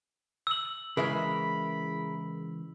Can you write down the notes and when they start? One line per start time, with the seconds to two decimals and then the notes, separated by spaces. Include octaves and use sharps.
0.47 E6 F#7
0.97 C#3 E3 G#3 G#4 A#4 E5 B5